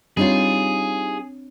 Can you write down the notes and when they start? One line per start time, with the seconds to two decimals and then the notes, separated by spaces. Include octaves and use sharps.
0.17 G3 C4 D4 D#4 F4 G#4 C#5